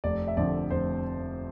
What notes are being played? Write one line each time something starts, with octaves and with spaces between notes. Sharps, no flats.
F1 D5
E5
F2 D3 D5
F1 C5